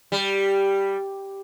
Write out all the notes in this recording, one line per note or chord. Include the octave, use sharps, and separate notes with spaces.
G3